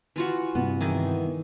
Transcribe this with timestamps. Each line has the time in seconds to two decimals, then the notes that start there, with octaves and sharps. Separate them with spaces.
0.16 E3 F4 F#4
0.55 G2 C3 B3
0.81 D#3 E3 D#4 G#4